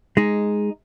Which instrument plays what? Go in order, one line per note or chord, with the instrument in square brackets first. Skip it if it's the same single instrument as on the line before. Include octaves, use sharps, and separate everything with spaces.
[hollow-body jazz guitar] G#3 D#4